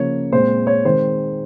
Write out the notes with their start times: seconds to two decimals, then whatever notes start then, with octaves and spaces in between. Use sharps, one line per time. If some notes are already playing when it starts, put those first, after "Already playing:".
Already playing: C#3 F3 A#3 C#5
0.32 A#2 G#3 C4 C5
0.67 C#5
0.85 D#3 G#3 C4 C5